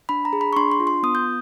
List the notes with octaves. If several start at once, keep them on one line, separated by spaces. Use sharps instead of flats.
D4 B5
A#5
G#4
B5
C#6
D4 C6
C6
F4
C6
B3 D#6
G6